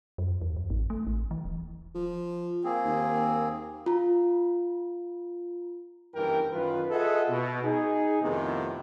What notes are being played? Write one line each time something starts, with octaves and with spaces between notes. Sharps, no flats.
F#2
E2
F#2
A1
A3
A1
E3
D#1
F3
A#3 C4 G#4
D#2
F4 A#5
F#1 G2 E3 A#4 G5
F#2 D#3 F4 B4
F4 G#4 A4 D#5 E5 F#5
B2
D#4 G#4
F2 A2 C3 D#3 B3